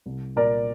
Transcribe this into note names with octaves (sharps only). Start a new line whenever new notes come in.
C2
A#2 A#4 D5